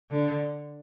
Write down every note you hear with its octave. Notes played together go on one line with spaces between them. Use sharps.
D3